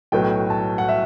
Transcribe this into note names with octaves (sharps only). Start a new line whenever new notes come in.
B1 A2 F#3 B3 G5
A5
F#5
E5